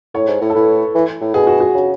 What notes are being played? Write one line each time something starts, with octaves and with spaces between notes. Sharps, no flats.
A2 C#5
G#2
A2
A4
A2 B4
E3
A2
B2 G#4
F#4
F#4
C#3